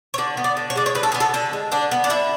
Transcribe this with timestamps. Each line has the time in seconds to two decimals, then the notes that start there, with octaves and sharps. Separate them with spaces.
0.14 C#5
0.18 D3 D5
0.37 B3
0.44 D5
0.57 D3
0.70 C#5
0.76 G#3 D5
0.86 C#5
0.95 D3 B4
1.03 A4
1.12 B3 G#4
1.20 A4
1.34 D3 A4
1.53 G#3
1.72 D3 D4
1.91 B3
2.04 D4
2.10 D3 E4